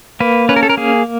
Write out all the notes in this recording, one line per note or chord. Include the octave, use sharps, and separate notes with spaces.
A#3 B4
C#4 B4
A#4
A4
A#4
A#3 G#4